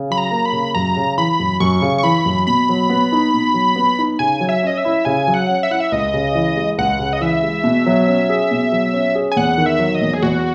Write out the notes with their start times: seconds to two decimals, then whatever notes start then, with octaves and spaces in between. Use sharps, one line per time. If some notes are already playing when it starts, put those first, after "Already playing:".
Already playing: C#3
0.10 F#3 B5
0.18 A#5
0.31 A#3
0.45 B5
0.53 C#3
0.75 F#2 A#5
0.97 C#3
1.18 E3 B5
1.40 F#2
1.60 F#2 C#6
1.82 C#3
1.98 C#6
2.03 E3 B5
2.26 F#2
2.47 B2 B5
2.69 F#3
2.90 B3
3.12 D#4
3.34 B2
3.54 F#3
3.76 B3
3.99 D#4
4.19 C#3 G#5
4.40 F#3
4.49 E5
4.63 C#4 D#5
4.78 E5
4.85 E4
5.05 C#3 G#5
5.27 F#3
5.34 F#5
5.48 C#4
5.63 E5
5.70 E4 F#5
5.80 E5
5.92 C#2 D#5
6.14 C#3
6.35 E3
6.57 G#3
6.78 C#2 F#5
6.99 C#3
7.13 D#5
7.21 E3 E5
7.43 G#3
7.64 B2
7.86 F#3
8.07 C#4
8.29 G#4
8.51 B2
8.72 F#3
8.93 C#4
9.15 G#4
9.32 G#5
9.36 E2 F#5
9.58 D#3
9.66 E5
9.79 F#3
9.95 D#5
10.01 E2
10.14 G#4
10.22 E2 F#4